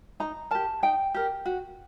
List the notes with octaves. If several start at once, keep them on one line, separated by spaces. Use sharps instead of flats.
D#4 A#5
G4 A#4 A5
D#4 G5
G4 A#4
F#4